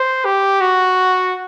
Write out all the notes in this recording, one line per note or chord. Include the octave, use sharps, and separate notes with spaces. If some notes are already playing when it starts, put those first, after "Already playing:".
Already playing: C5
G4
F#4